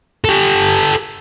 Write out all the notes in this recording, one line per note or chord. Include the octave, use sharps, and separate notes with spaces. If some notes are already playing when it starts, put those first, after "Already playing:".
G4 A4